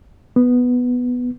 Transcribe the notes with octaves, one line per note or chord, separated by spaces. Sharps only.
B3